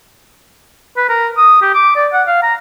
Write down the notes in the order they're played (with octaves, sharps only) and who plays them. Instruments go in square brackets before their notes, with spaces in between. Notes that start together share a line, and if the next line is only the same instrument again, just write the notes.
[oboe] B4
A#4
D#6
G4
D6
D5
F#5
F5
A#5